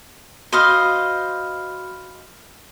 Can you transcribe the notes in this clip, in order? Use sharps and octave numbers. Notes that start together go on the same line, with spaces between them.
F#4 C5 D#5 F5 B5 F6